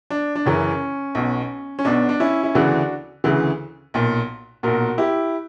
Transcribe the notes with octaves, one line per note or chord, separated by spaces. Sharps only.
D4
D4
F#1 F#2 C#3 E3 C#4
B1 B2
C#4
B1 B2 D4
D4
C#4 E4
E4
D2 C#3 E3 D4 F#4
D2 C#3 E3
B1 A#2
B1 A#2 F#4 A#4
E4 G4